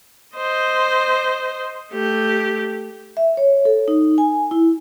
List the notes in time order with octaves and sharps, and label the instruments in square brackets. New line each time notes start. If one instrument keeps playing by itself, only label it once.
[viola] C5 D#5
A3 G4
[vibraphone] E5
C#5
A4
D#4
G#5
E4